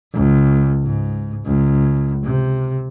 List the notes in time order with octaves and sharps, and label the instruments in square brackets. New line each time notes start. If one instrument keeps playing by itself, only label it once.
[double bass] C#2
G#2
C#2
C3